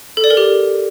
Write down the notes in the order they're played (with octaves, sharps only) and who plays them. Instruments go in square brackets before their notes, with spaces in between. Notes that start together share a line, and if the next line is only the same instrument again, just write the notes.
[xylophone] A4
D5
A#4
G4